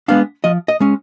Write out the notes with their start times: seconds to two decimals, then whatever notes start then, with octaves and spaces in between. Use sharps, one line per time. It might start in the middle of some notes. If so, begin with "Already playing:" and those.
0.08 G#3 B3 D4 F5
0.44 F3 D#5
0.68 D#5
0.80 G#3 C#4